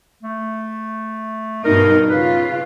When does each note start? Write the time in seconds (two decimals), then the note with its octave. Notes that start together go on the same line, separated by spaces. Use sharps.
0.23 A3
1.65 G2 B2 D#4 A#4
2.10 C#3 F4 B4